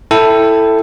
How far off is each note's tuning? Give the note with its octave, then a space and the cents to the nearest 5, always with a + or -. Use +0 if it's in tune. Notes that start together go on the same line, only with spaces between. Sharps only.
E4 +0 A4 +10 G5 +10